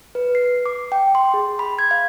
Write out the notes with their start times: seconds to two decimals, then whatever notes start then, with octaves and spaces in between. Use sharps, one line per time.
0.15 B4
0.35 C7
0.66 D6
0.92 G5
1.15 C6
1.34 G#4
1.59 B5
1.79 G#6
1.91 F5